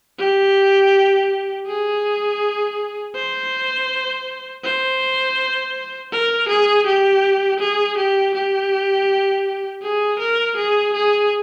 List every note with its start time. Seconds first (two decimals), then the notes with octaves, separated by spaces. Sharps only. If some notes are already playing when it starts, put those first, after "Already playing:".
0.19 G4
1.67 G#4
3.15 C5
4.64 C5
6.12 A#4
6.49 G#4
6.87 G4
7.60 G#4
7.97 G4
8.35 G4
9.83 G#4
10.20 A#4
10.57 G#4
10.94 G#4